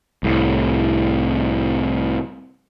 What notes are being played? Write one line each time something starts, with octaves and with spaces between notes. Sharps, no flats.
C2 A2